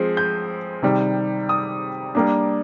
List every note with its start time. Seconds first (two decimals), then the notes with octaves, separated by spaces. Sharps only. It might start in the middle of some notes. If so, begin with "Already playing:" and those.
Already playing: F3 G#3 C4
0.17 G6
0.83 C3 D#3 G3
1.49 D#6
2.15 G3 A#3 D4